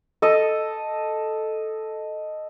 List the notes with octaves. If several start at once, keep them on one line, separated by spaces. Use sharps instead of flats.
A4 D#5